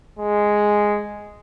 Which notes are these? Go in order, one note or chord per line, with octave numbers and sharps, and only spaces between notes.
G#3